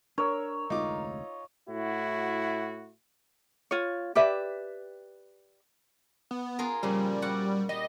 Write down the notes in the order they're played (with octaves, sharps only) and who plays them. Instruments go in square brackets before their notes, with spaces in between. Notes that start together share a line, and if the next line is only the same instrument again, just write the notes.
[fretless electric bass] D4 [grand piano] A#4 [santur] C#5 E6
[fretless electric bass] F1 D2 G#3 [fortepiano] D#4 F4 D6
[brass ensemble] A2 E4 F#4
[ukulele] F4 C#5
G4 B4 D5 E5
[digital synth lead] B3
[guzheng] F4 G#4 A#4
[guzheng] A#2 C#3 F3 [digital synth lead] G3
[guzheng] F#4 D5 F#5
[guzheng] G3 [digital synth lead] D#5